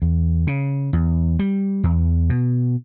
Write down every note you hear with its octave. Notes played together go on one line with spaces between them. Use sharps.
E2
C#3
E2
G3
E2
B2